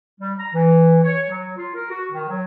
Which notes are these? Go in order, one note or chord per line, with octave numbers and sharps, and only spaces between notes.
G3
A#5
E3
C#5
F#3
F4
A#4
F#4
D#3
F#3